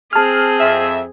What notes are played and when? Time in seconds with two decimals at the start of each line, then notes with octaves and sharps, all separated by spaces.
0.13 C4 G#4 A5 F6
0.60 F2 E5